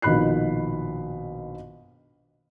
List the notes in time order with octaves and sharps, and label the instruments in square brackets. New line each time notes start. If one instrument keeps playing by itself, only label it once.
[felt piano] A#1 B2 D#3 B5 F#6 C7